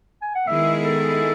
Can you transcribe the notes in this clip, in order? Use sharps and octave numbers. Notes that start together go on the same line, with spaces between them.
G#5
F#5
D#3 G#3 B3 E4 G#4 E5
A4